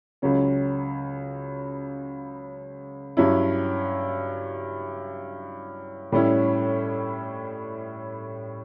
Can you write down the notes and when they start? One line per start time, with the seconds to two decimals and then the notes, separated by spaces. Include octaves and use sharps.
0.22 C#2 C#3 F#3 C#4
3.17 G2 F#3 C#4 E4
6.12 A2 G3 C#4 E4